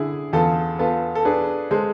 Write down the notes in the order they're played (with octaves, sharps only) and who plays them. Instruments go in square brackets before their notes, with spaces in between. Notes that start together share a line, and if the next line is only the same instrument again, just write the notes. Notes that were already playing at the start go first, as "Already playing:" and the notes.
Already playing: [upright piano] D3 [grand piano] E4 G#4
[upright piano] E2 [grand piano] F4 A4
[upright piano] B3 [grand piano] F4 A4
[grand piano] A4
[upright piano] D4 [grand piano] G#4 B4
[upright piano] G#3 [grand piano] A4 C5